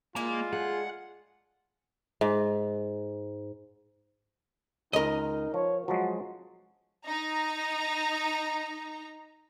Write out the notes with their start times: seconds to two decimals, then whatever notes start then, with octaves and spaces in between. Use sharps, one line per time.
0.16 G#3 A#3 D4 E4 F4
0.53 G#4 F#5
2.21 G#2
4.93 C#2 D#4 A#4 D#5
5.54 F3 C#5
5.88 F3 F#3 G#3 F#4
7.05 D#4 A#5